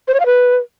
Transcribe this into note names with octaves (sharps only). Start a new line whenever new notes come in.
C5
C#5
F5
B4